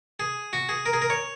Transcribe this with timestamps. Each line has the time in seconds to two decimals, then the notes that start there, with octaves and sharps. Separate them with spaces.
0.20 G#4
0.53 F#4
0.69 G#4
0.86 A#4
0.93 G#4
1.02 A#4
1.10 C#5